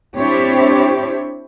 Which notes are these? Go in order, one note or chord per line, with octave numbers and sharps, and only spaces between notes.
C4 D4 E4 G4 C5 C#5